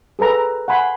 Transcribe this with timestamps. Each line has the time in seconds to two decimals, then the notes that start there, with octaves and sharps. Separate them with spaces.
0.19 G#4 A4 B4 A#5
0.68 F#5 G#5 B5 C6